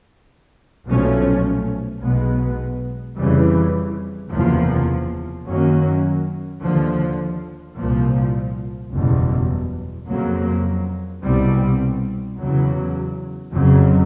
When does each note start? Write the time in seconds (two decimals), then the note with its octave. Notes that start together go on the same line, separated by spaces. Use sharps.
0.86 B1 A#2 F3 A3 C#4
2.02 B1 B2 G#3 B3
3.18 F2 C#3 E3 G3
4.32 F#1 E2 C3 F3 A#3
5.48 F#2 D#3 F#3 A#3 C#4
6.63 D#2 D3 F3
7.78 C2 A#2 F3
8.94 F#1 E2 B2 G3
10.09 F2 C#3 F#3 A#3
11.24 C2 B2 G3 C4
12.39 E2 C#3 F#3
13.55 F#1 F2 C#3 F#3